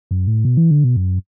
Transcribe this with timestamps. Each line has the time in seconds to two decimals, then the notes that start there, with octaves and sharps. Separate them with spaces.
0.11 F#2
0.27 A2
0.45 B2
0.57 E3
0.71 D3
0.84 B2
0.96 F#2